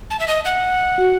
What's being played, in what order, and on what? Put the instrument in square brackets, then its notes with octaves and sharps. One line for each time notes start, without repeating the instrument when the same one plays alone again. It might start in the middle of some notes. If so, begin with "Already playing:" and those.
[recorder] A5
E5
D#5
F#5
[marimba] F#4